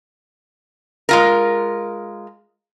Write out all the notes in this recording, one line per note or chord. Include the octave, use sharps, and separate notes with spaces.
G#3 F4 A#4